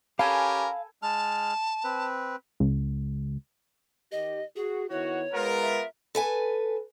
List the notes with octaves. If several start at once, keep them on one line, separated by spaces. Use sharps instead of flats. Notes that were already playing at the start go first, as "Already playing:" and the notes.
C#4 G4 A4 A#4 F5 G#5 B5
G#3 A5 F6
C4 B4
C#2
D#3 G4 D#5
F#4 G#4
D#3 B3 E4 F#4 C#5
G#3 B3 F4 A#4 B4
E5
A4 B4 G#5